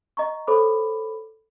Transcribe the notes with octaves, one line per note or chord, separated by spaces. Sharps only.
D#5 A#5 C#6
A4 C5 C#5 B5 D6